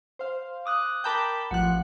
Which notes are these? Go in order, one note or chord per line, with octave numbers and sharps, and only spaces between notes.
C5 F5
D6 D#6 F#6
A#4 G5 A5 B5 D6 G6
A1 F3 F#5 F#6